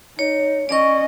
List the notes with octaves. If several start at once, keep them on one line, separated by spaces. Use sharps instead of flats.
D#4 C#5
C#4 D5 D#5 C#6